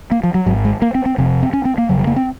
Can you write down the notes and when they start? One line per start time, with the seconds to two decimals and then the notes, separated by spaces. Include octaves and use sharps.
0.12 A#3
0.23 F3
0.34 F#3
0.46 G#1 G#2 F#3
0.65 G#3
0.82 A#3
0.95 C4
1.06 C4
1.18 F1 F2 C3 C4
1.43 C4
1.53 C#4
1.65 C4
1.78 A#3
1.89 F1 F2 C#3 F#3
1.99 F#3
2.07 A#3
2.16 C4